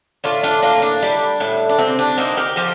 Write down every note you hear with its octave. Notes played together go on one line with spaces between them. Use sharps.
A2 D4 F4
D4 F4
A#3 D4 F4
D4
G3
A2
D4
C3 C4
D4
A#3 C4 D#4
G4 A#4
F3 G4 A#4